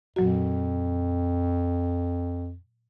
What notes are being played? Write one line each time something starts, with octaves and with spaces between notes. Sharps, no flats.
F2 A#2 F#3 F#4